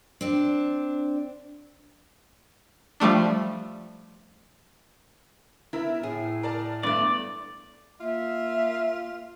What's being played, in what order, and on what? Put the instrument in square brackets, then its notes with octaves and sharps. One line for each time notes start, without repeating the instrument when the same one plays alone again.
[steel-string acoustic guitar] C4 D4
[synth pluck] F3 G3 A3 D4
[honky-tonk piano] B3 A#4 E5 [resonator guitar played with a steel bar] E4
[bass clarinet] A2 [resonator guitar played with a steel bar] G#4
[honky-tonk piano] A#4 D5 A5
[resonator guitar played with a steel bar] G2 A3 [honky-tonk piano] B3 [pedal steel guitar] D5
[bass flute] A#3 [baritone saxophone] F4 [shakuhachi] E5